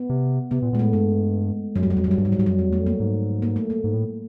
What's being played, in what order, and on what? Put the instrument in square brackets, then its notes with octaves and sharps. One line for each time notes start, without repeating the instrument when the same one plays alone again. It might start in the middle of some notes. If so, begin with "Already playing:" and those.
Already playing: [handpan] B3
[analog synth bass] C3
[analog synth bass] C3 [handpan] B3
[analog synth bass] A#2
[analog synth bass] A#2 [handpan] G#3
[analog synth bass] A2 [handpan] A3
[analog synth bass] G2 [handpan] G#3
[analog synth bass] F#2 [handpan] F#3
[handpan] G3
[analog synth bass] F#2
[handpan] F#3
[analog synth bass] F2 [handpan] G3
[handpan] F#3
[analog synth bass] F#2
[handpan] G3
[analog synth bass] G2 [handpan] F#3
[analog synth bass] G#2 [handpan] G3
[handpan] F#3
[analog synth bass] G#2 [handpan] G3
[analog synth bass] F#2 [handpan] F#3
[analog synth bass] F2 [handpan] G3
[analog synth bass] E2
[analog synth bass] F2 [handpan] A3
[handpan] A#3
[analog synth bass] G#2
[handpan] A#3
A3
A#3
[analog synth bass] G#2
A2